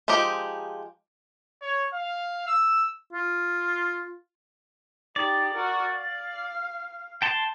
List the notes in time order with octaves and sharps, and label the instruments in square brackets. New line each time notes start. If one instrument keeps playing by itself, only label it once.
[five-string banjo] F3 G#3 D#4 G4 A#5
[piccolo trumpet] C#5
F5
E6
[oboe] F4
[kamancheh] D#4 G4 [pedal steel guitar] D5
[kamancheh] F#4 A#4
F5
[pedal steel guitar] G5 A5 C6